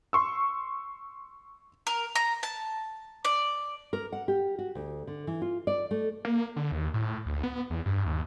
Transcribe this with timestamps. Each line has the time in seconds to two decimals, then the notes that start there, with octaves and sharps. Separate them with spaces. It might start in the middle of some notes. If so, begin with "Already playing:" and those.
0.13 C6 C#6 E6
1.87 A#4
2.15 A#5
2.43 A5
3.25 D5
3.93 A#4
4.13 F#5
4.28 G4
4.59 F#4
4.75 D2
5.07 D3
5.27 E3
5.42 F4
5.67 D5
5.91 A3
6.25 A#3
6.56 D3
6.72 D#2
6.94 A2
7.26 D2
7.43 B3
7.70 E2
7.86 G2
8.06 D#2